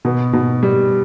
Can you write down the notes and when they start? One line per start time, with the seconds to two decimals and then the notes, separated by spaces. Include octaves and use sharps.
0.05 B2 B3
0.33 B2
0.63 G3